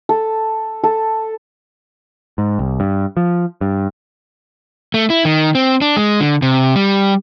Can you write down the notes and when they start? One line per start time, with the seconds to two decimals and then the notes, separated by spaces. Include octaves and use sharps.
0.09 A4
0.84 A4
2.38 G#2
2.59 C2
2.80 G2
3.17 F3
3.61 G2
4.94 A3
5.10 E4
5.25 D#3
5.55 C4
5.82 D4
5.97 G#3
6.20 D3
6.42 C3
6.76 G3